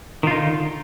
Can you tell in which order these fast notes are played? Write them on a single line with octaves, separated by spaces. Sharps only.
D#3 F4 D#4 D3